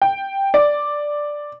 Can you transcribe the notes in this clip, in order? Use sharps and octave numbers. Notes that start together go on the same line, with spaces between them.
G5
D5